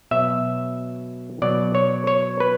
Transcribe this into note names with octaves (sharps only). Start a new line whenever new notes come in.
B2 F#3 E5
B2 F#3 D5
C#5
C#5
B4